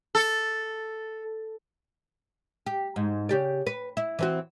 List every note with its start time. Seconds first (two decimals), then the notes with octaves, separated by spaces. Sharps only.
0.15 A4
2.66 G4
2.96 G#2
3.29 C#3 G4 D5
3.67 B4
3.97 E4
4.19 E3 C4 F#4